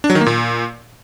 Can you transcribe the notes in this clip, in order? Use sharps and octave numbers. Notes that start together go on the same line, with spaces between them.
D4
F#3
D#3
A#3
A#2